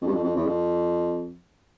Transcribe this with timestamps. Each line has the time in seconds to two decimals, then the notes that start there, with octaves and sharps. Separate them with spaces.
0.01 F2
0.07 G2
0.13 F2
0.24 F2
0.36 E2
0.46 F2